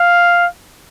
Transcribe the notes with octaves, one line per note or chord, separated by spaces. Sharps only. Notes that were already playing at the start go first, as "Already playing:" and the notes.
Already playing: F5